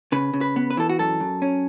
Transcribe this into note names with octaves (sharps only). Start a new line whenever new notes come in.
C#3 B4
C#3
B4
B3
B4
E3 A4
F#4
F#2 A4
F#2
C#4